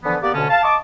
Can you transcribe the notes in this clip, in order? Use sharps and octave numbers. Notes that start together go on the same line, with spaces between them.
D3 E3 F3 B3
A#3 B3 G4 D5
D2 B2 D3 C#4 A5
F5 A5
D#5 A5 C#6 D6